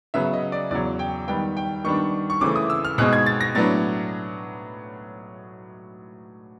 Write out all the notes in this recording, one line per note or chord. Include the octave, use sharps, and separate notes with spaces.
C#3 F#3 B3 E5
D#5
D5
E2 C#3 F#3 D5
G5
D#3 G3 B3 G5
G5
D#3 G3 B3 D4 C#6
C#6
C#3 E3 A3 C4 D6
D#6
E6
F6
B2 G#3 C4 D#4 F#6
G#6
A6
A#6
A2 F#3 B3 D4 A6